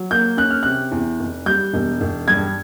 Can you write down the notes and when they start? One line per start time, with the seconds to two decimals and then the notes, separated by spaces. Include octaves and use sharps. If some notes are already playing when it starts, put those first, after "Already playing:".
Already playing: F#3
0.11 A#3 G6
0.37 C#4 F#6
0.51 F6
0.63 C3 F#6
0.91 E2
1.20 F1
1.46 G3 G6
1.74 E1
2.01 E1
2.28 G2 G#6